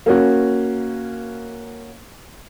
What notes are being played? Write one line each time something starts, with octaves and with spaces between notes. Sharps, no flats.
A#3 C#4 F#4